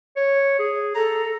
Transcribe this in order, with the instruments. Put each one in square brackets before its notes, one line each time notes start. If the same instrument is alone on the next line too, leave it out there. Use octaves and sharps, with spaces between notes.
[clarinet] C#5
G#4
[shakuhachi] A4 [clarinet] A#5